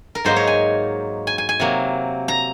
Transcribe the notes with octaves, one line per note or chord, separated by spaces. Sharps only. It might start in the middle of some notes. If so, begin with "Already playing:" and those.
A#4
G#2 F#3 A#3 D#4 C5
C#5
G#5
G#5
G#5
G#5
C3 F#3 A#3
A#5